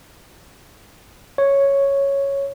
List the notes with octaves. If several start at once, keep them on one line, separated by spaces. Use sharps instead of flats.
C#5